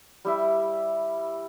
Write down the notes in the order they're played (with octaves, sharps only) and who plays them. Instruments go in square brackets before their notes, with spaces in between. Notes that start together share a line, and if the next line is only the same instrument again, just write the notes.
[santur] G3 E4 E5